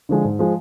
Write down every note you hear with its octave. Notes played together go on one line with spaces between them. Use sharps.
D3 F3 G#3
G#2
F3 G#3